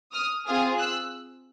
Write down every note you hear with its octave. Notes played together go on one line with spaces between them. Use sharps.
D#6 F6
C4 F4 G#4 D#6 F6
E6 F#6